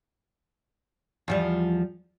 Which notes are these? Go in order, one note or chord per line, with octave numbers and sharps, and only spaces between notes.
E2 F3 G3